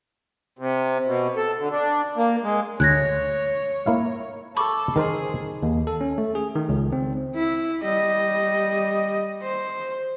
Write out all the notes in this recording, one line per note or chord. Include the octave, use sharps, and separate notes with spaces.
C3
B2
A4
D3
D4
A#3
G#3
D2 C#5 F#6 G#6 A#6
A#3 E4 F5
A4 B5 C#6 D6
D#3 G#4 A#4 C5
D#2
A4
C#4
A3
G#4
D#3
C#2
C4
E4
G3 D#5
C5